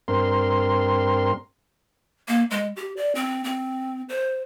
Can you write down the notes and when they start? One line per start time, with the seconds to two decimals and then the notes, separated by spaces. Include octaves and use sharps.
0.08 G2 C4 A#4 C6
2.28 A#3
2.51 G#3
2.76 G4
2.97 D5
3.15 C4
3.44 C4
4.09 C5